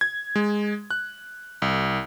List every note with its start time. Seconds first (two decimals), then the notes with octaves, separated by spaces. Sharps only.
0.01 G#6
0.36 G#3
0.91 F#6
1.62 C2